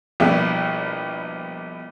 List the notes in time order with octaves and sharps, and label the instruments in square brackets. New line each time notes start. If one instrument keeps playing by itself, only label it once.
[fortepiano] A#1 B2 G3 E4 D5